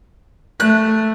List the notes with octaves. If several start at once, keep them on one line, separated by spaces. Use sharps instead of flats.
A3 F#6